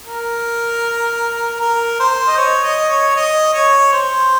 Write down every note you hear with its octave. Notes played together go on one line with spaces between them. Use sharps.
A#4
A#4
C5
D#5
C#5
D#5
C#5
D#5
C#5
C5